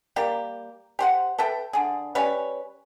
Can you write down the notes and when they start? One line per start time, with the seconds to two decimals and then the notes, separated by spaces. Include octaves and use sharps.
0.16 G3 A#3 G4
0.99 G4 C5 F#5
1.38 A4 B4 E5 G5
1.73 D3 G#4
2.15 G3 C#4 B4 C#5